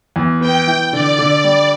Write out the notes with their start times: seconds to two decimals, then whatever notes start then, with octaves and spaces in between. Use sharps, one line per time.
0.16 E2
0.41 B3 G5
0.67 E3
0.92 D3 D5
1.18 D3
1.44 G3